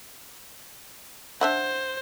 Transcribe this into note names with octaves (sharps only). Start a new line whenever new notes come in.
D4 C5 E5 F#5